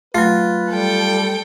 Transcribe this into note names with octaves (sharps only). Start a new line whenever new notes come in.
F#3 A3 F4 B4
G3 A4 G5